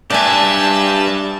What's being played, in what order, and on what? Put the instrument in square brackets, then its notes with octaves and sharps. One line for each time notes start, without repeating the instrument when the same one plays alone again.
[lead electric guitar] G2 G4 [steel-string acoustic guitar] D5 G#5 [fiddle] E5 A5